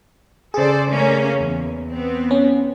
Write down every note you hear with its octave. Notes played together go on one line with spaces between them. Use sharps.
C#3 G#4 A4 C5 D5
A3 A#3 C#4
E2
B3 C4
C#4